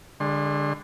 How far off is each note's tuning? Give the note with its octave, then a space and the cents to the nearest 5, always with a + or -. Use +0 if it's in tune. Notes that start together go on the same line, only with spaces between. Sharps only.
D3 +0 G#3 -35 C6 +30